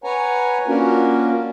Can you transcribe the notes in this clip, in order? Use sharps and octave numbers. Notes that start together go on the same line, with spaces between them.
B4 C#5 F#5 G#5 A#5
A#3 C#4 D4 F4 F#4 A#4